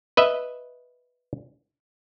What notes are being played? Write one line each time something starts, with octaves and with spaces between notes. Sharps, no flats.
B4 D#5 E5